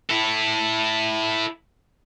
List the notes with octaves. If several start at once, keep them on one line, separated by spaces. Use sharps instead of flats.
E4 A4